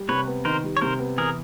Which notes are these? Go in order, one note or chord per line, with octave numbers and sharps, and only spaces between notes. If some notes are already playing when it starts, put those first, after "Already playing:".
Already playing: G3
C3 B4 C#5
B3
D#3 A#4 C5
G3
C#5
C3 A#4 C5
B3
E3 G#4 A#4